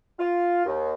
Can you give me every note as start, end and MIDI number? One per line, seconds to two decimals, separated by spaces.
0.19 0.64 65
0.66 0.94 39